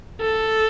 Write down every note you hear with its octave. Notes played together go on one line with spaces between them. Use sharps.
A4